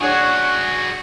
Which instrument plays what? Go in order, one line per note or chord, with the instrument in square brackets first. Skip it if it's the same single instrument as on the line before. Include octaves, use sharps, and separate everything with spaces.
[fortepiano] D4 C#5 [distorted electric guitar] F#4 G#4 [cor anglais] F#5 [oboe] C#6